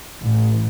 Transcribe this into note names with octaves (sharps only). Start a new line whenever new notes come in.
A1